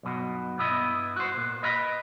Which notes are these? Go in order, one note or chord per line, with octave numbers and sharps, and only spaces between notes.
B1 G2 B2
G2 B3 E4 D#5
F#4 C5
A#2
B4 D#5 E5 B5